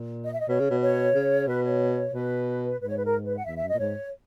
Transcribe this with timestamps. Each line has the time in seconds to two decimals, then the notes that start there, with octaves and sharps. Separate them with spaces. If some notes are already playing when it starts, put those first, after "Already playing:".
Already playing: A#2
0.24 D#5
0.32 E5
0.40 D#5
0.48 B2 C#5
0.60 C#3
0.71 B2
0.81 C#5
1.15 C#3
1.47 B2 B4
1.64 C#5
2.14 B2 B4
2.80 G#2 B4
2.88 C#5
2.96 B4
3.05 A#4
3.24 B4
3.38 F#5
3.45 E2 E5
3.57 E5
3.63 F#2
3.69 D#5
3.74 A#2
3.79 G#2 C#5